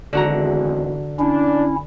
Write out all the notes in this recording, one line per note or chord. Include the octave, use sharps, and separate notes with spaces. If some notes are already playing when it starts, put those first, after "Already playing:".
G#1 E2 D3 F#4 A#5
C#4 D4 E4